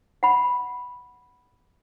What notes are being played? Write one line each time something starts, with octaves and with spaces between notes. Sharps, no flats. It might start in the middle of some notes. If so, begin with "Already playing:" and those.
F#5 B5